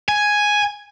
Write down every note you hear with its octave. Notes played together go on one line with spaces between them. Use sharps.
G#5